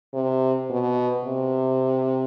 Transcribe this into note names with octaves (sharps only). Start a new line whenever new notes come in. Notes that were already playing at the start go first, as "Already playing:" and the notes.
C3
B2
C3